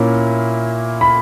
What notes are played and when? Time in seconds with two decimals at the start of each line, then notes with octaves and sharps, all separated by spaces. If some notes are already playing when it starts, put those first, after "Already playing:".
Already playing: A#2 A#3 C#4 E4
1.01 B5